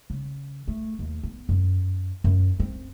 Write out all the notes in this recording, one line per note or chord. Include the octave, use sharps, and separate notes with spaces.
C#3
A3
D#2
B3
F#2
F#2
C4